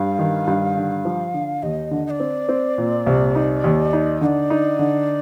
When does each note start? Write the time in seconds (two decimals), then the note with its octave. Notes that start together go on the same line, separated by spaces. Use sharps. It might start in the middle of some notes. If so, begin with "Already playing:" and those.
Already playing: G2 F5
0.19 D#3
0.47 G2
0.77 D3
1.05 F3
1.34 D3
1.63 D#2 D#5
1.91 D3
2.06 D#5
2.10 D5
2.20 C4
2.49 C4
2.78 A#2
3.06 C2
3.35 D#4
3.64 D#2
3.93 D#4
4.21 D3 D5 D#5
4.50 D#4
4.79 D3